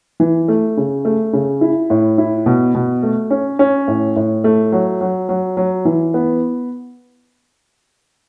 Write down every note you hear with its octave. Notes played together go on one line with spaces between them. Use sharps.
E3
A3
C#3
A3
C#3
E4
A2
E4
B2
B2
A3
C#4
C#4
A2
A2
A3
F#3
F#3
F#3
F#3
E3
B3